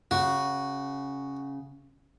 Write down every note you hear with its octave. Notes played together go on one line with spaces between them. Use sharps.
C#3 F#4